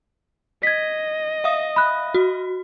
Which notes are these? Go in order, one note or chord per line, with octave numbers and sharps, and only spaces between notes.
D#5 G#6 B6
E5 F5 D#6
B5 F#6
F#4